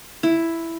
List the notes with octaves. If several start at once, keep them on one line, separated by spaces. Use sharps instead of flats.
E4